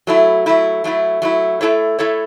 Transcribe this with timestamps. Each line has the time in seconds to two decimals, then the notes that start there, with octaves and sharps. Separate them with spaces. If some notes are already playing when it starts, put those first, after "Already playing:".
0.07 F#3 A3 E4
0.46 F#3 A3 E4
0.84 F#3 A3 E4
1.22 F#3 A3 E4
1.61 A3 E4 A4 C#5
1.99 A3 E4 A4 C#5